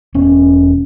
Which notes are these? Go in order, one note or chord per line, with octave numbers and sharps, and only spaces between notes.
E1 C#4